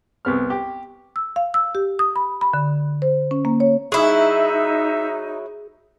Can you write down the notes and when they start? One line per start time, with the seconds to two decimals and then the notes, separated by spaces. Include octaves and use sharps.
0.25 C2 B3 F6
0.50 G4
1.16 E6
1.36 F5
1.54 E6
1.75 G4
1.99 D#6
2.16 B5
2.41 B5
2.54 D3
3.02 C5
3.31 C#4
3.45 A#3
3.60 C#5
3.92 F#3 D#4 E4 G#4 E5